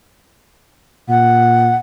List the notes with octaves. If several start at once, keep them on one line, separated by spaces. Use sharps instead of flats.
A#2 F#5